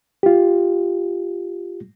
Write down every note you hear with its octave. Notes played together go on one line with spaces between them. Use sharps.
F4 G4